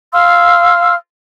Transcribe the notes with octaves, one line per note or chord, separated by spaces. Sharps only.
F5 C6 E6 F6